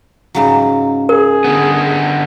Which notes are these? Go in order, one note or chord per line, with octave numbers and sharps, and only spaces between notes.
G#2 C#3 F#3
G#4 A#4
D3 B3